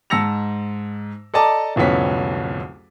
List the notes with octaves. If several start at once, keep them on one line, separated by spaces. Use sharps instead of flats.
G#2 A5 E6 A#6 C#7 F7
A4 D5 D#5 A5 A#5 D6
D1 C2 F2 B3 C#4 B6